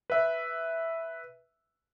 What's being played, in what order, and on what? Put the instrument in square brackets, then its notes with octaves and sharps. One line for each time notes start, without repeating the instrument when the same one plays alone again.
[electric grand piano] B4 E5